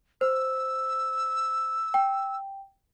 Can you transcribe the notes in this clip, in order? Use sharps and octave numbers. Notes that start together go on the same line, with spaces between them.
C5 E6
G5